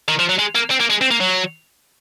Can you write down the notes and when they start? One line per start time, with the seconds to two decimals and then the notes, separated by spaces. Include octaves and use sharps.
0.08 D#3
0.19 F3
0.29 F#3
0.39 G#3
0.55 A#3
0.70 C4
0.80 A#3
0.90 G#3
1.01 C4
1.11 A#3
1.21 F#3